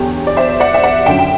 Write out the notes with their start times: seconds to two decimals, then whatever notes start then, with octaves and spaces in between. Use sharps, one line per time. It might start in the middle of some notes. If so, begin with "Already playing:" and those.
Already playing: E2 D3 F#3 G4
0.27 D5
0.36 C5 E5
0.60 D5 F#5
0.74 E5
0.83 D5 F#5
1.06 F#2 D3 F#3 E5 G5
1.19 G5